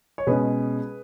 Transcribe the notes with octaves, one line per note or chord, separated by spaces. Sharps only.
C#5
B2 G#3 C#4 G#4 B4